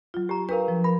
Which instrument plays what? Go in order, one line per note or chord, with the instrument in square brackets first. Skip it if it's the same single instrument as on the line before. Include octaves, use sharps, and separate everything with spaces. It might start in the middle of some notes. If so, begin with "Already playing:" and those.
[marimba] F#3 F4
[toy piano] G4 A#5
[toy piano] D4 G#4 A#4 [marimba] B4 F5
[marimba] F3
[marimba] A#4 [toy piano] B5